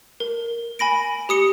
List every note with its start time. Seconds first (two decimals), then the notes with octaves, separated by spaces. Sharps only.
0.20 A#4
0.79 G#5 B5 A#6 D7
1.29 G4 D#6 C#7 G7